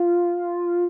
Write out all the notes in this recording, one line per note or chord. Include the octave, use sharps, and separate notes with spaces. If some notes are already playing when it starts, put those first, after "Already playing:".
Already playing: F4